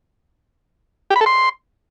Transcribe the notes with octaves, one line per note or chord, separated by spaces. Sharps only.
G4
B5
A4
C6